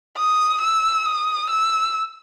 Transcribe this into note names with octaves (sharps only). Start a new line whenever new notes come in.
D#6
E6
D#6
E6